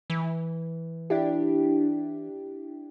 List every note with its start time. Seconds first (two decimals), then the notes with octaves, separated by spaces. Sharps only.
0.10 E3
1.10 D4 E4 G4